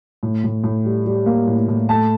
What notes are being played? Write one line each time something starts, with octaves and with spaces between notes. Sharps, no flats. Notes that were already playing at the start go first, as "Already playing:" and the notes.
A2
A2
A2
G3
G3
A#3
A2
A2
A3 A5